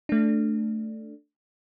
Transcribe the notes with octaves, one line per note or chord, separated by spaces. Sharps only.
A3 D4